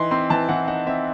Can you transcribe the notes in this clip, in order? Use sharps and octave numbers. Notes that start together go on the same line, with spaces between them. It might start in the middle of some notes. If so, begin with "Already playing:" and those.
Already playing: E3 D#4 C6
C4 C6
E3 A5
E3 F#5
D#4 F#5
C4 E5